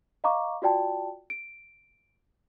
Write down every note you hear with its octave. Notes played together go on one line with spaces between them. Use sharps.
D#5 F5 A#5 C#6 D6
F4 F#4 D5 G5 A5
D7